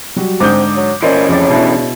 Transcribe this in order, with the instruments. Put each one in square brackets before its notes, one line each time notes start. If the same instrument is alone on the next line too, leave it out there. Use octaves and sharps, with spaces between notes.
[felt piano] F#3 G3 F#4
[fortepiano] G#2 D3 [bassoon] C4 [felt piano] D6 D#6 G6
[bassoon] F#3
[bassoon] A#2 [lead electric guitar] E3 C#4 [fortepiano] C5 D5 D#5
[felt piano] F2 D6 A6 [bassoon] C#3
[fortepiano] B2 E4 [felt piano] D4